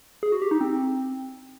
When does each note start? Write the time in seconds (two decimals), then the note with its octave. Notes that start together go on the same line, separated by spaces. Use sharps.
0.23 G#4
0.32 F#4
0.42 G4
0.51 D#4
0.61 C4